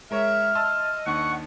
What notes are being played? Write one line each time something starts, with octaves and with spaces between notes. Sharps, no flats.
G#3 A#4 C#5 E5 F6
D#5 A5 C6 E6
D#2 D4 F#5 C#6 C#7